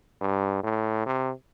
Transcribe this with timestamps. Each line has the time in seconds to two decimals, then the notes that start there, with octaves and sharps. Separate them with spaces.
0.21 G2
0.63 A2
1.06 C3